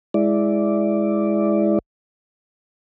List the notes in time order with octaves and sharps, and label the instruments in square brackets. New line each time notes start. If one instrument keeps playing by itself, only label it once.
[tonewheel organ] G#3 E4 D5